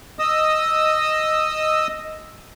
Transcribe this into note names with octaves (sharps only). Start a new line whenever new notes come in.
D#5 D#6 E6